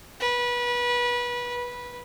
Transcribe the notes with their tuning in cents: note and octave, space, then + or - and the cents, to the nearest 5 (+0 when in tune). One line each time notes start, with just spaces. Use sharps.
B4 -25
B4 -15